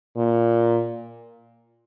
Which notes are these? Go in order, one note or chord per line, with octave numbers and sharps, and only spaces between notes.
A#2